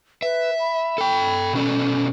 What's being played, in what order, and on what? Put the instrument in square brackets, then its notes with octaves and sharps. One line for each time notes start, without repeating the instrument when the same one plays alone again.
[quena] B4 [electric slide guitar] E5
[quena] B5
[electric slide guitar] A4 G5
B2 C#4 A4